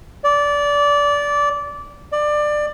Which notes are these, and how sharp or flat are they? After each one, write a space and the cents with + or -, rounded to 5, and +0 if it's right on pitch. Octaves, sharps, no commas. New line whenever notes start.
D5 -20
D5 +20